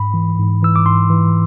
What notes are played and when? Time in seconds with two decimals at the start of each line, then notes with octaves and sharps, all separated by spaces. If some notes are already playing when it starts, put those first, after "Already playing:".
Already playing: G#2 B5
0.14 E3
0.39 G#2
0.62 E3 E6
0.76 D6
0.85 G#2 C6
1.10 E3